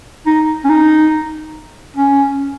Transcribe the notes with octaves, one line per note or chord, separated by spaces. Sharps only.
D#4
C#4
D#4
C#4